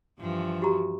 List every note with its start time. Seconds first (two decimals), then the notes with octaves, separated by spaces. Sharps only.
0.20 G2 E3 F3
0.62 F#4 G4 A#5